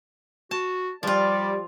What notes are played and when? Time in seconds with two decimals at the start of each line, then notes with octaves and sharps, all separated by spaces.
0.51 F#4 A5
1.03 F3 G3 F4 D5